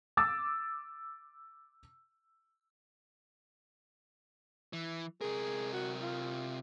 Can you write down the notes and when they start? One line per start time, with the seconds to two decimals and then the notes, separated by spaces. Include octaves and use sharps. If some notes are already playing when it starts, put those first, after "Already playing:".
0.17 D6 E6 A6
4.73 E3
5.21 C3 G#4 A#4
5.73 F#4
6.02 F4